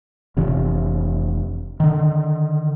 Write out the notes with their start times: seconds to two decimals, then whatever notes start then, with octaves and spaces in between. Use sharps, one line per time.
0.37 F1 C3 E3
1.80 D3 D#3